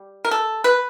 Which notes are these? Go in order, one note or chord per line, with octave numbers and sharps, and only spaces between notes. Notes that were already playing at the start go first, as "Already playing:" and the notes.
Already playing: G3
A#4
A4
B4